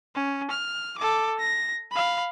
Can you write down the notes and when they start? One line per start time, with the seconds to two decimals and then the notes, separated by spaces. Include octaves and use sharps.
0.15 C#4
0.50 F6
0.98 A4 D6
1.39 A#6
1.91 F5 B5